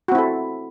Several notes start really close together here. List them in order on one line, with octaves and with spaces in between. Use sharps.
F#4 C4 E4 A4